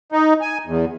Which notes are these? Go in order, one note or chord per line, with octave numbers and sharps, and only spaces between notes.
D#4
G#5
E2